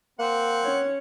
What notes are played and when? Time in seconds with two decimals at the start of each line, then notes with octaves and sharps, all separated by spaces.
0.19 A#3 C4 F#5
0.64 C#4 C#5